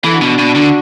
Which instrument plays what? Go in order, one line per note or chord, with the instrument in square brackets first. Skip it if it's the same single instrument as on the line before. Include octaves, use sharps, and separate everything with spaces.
[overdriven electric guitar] E3 [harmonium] A4
[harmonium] D4 F#4
[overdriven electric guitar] B2
B2
D3